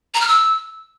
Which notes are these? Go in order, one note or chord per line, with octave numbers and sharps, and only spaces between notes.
A#5
F6
E6